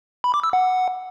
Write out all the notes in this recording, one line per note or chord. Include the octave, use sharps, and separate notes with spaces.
B5
D6
E6
F#5